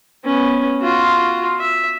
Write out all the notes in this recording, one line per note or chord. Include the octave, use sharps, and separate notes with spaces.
B3 C#4
F4 F#4
E5